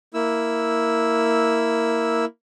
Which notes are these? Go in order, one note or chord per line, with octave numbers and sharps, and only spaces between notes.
A#3 E4 E6